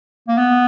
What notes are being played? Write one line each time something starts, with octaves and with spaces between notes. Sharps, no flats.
A#3
B3